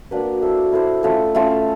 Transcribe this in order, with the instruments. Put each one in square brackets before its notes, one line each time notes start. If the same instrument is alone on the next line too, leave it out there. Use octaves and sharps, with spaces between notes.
[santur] A#3 D4 F#4 B4
E4 A4 C5
E4 A4 C5
A3 C#4 F4 A4
A3 C#4 F4 A4